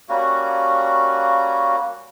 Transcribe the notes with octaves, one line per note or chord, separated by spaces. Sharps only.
G3 A#3 C#4 F#4